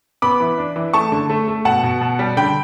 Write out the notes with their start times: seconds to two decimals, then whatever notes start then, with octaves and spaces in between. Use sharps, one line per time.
0.22 B3 B5 D6
0.40 E3
0.58 D4
0.76 E3
0.94 A3 A5 C#6
1.12 D3
1.30 A3
1.48 A3
1.65 B2 F#5 A5
1.83 B2
2.01 B2
2.19 G3
2.37 D3 G5 B5